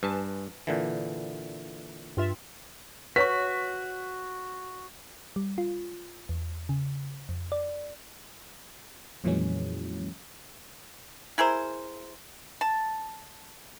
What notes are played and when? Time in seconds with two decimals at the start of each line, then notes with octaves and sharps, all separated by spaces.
0.03 G2 B4 G#5 A5
0.67 A#2 D3 E3
2.17 G2 F4 E5
3.16 F#4 B4 C#5 C#6 B6
5.36 G3
5.58 F4
6.29 E2
6.69 C#3
7.29 F2
7.52 D5
9.24 F2 A#2 E3 F#3 G#3 C#4
11.38 E4 G#4 A#4 C5
12.61 A5